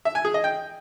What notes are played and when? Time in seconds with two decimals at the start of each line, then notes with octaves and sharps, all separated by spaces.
0.05 E5
0.15 G#5
0.25 G#4
0.34 D#5
0.44 G5